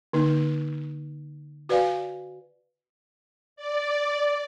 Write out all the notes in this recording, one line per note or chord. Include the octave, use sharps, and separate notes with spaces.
D3 A#3 D#4
F#4 B4 D5 F5 G#5
D5